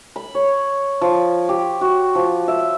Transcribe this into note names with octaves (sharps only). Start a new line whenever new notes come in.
B5
C#5
F3
G4
F#4
F3
E5